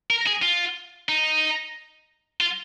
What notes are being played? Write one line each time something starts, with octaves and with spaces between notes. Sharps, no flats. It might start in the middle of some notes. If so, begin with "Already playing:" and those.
A#4
G#4
F4
D#4
F4